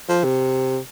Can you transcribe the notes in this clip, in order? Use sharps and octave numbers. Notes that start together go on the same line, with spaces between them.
F3
C3